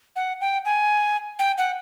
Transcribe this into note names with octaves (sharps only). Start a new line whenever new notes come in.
F#5
G5
G#5
G5
F#5